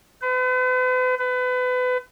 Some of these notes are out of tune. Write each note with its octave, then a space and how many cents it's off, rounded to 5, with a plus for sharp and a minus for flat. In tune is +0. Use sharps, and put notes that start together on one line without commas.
B4 +45
B4 +30